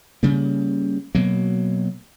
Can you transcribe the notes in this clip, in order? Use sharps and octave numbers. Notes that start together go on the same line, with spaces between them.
C#3 G3 A#3
B2 F#3 A#3